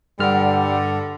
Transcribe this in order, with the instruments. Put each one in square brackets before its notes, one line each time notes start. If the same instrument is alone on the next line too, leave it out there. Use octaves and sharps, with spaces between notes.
[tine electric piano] G2 F6 [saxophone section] D3 [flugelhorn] G3 [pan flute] F#5